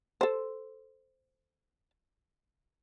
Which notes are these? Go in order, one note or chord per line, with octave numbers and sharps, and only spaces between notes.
A4 C5